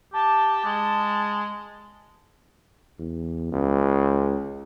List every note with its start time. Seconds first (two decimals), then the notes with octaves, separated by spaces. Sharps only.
0.13 G4 A5
0.65 G#3
2.99 E2
3.52 C#2